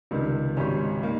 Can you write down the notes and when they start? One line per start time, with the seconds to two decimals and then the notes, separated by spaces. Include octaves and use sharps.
0.11 C#2 C3 D#3 G3
0.57 G#1 G#2 G3 C#4 G4
1.03 D#3 G3 A#3